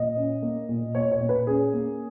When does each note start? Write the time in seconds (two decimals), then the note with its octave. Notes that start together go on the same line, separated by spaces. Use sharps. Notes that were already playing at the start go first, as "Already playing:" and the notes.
Already playing: A#2 D#5
0.17 C#4
0.42 A#3
0.69 A#2
0.95 A#2 C#5
1.12 C#5
1.21 A#2
1.29 B4
1.47 C#4 G#4
1.73 A#3